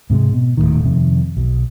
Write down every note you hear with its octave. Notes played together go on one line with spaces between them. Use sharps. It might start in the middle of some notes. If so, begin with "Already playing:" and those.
G#2 C3 F3 G#3
B2
D#1 C2 A2 D#3
F2 C3 D#3
B1